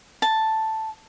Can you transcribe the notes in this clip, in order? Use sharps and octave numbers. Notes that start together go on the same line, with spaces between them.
A5